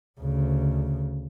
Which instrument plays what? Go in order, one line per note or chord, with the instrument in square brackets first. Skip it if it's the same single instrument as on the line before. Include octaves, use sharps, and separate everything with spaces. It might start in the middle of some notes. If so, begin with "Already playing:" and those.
[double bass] D2 C#3